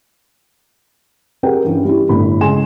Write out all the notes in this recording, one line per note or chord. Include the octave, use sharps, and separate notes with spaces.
G4 G#4 A#4 F#5 G5
G2 E3 C#4
G3 E4
G1 A2 B5
C#3 G#3 G#5 C6 E7